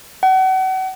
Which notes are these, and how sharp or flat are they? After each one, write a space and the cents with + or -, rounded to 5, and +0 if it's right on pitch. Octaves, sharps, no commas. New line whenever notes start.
F#5 +35